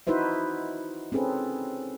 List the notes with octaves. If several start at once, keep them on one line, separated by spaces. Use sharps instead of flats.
D#4 E4 F#4 B4 C5 E5
C4 C#4 G#4 A4 B4